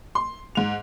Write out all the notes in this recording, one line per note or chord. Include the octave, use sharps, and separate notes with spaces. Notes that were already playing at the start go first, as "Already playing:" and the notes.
C6
G#2 F7